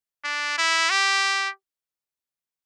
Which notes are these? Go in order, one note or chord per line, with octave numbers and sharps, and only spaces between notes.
D4
E4
G4